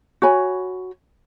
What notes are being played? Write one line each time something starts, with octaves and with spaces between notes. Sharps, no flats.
F#4 C#5 G#5 B5